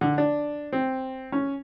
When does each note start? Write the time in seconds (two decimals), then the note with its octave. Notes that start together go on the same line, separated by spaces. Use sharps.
0.01 D3
0.18 D4
0.73 C4
1.32 C#4